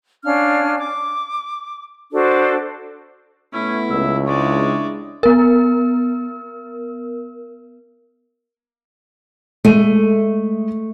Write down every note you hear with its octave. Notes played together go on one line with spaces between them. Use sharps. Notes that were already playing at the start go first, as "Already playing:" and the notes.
C#4 D4 F5 F6
D6
D4 F#4 A4 C5
A2 A3 B3 C#4 E4
C#2 E5
G#3 D4 E4 D5 C#6
B3 A#4
G#3 A3 D#7